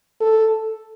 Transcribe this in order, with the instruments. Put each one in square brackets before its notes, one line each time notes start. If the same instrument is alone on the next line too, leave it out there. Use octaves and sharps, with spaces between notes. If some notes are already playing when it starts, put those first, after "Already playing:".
[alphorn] A4